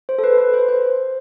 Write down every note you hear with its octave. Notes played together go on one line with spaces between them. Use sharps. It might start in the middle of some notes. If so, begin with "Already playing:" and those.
C5
A4
B4
B4
C5
C5